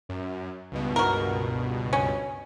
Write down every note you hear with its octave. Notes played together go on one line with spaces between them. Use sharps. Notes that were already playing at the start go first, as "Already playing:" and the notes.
F#2
C#2 G2 B2
F#4 A#4
C#4